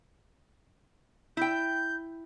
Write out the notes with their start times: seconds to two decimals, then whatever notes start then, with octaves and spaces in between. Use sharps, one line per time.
1.37 E4 G5 G6